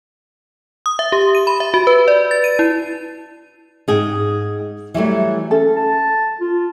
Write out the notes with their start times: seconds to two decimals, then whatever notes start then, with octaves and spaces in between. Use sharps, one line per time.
0.86 D#6
0.99 E5
1.12 G4
1.35 D#7
1.47 B5
1.60 E5
1.74 F#4
1.87 B4
2.08 D5
2.31 A6
2.44 D#7
2.59 E4
3.88 G#2 G#4 G5
4.94 E3 F#3 G3 A3
5.51 C#4 A4
5.76 A5
6.41 F4